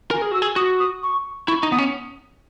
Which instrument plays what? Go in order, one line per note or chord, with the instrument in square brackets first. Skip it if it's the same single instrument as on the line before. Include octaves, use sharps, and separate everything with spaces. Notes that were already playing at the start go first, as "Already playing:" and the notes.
[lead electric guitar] A#4 [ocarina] G#5
[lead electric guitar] G#4
[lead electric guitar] F#4 [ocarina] E6
[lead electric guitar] G#4
[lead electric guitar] F#4 [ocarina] D#6
[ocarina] D#6
C#6
[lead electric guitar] E4 [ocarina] C#6
[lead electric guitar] D#4
[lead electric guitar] B3 [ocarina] D#6
[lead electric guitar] C#4